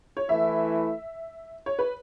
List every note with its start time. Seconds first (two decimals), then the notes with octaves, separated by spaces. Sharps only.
0.17 C#5
0.28 E3 A3 E4 E5
1.66 C#5
1.79 B4